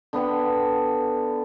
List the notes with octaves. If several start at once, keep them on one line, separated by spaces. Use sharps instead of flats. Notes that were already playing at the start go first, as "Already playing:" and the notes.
D3 B3 B4 G5